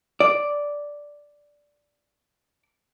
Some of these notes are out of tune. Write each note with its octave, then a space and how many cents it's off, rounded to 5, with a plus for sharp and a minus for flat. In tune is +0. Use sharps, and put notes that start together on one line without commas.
D5 -5